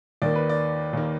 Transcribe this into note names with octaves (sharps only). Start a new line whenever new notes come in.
D#2 D#3 A#3 D5
B4
D5
D#2 D#3 A#3